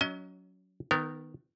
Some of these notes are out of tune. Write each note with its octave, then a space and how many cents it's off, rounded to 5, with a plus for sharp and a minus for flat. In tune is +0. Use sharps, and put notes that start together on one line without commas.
F#3 +0 C#4 +30 D#5 +30
D#3 +0 B3 +15 A#4 -25